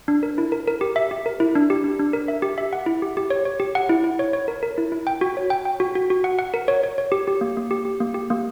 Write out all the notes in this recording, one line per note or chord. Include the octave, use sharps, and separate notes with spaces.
D4
A#4
E4
A#4
A#4
G4
E5
G4
A#4
E4
D4
G4
D4
D4
A#4
E5
G4
E5
F#5
E4
G4
G4
C#5
C#5
G4
F#5
E4
E4
C#5
C#5
A#4
A#4
E4
E4
G5
F#4
C#5
G5
G5
F#4
F#4
F#4
F#5
F#5
A#4
C#5
C#5
C#5
G4
G4
A#3
A#3
G4
G4
A#3
G4
A#3